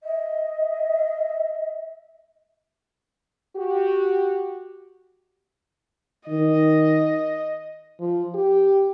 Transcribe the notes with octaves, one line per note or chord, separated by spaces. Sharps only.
D#5 E5
F#4 G4
D#3 D#5
F3
G4